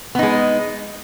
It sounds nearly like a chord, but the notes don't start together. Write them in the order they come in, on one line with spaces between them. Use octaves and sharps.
B3 D#4 G#3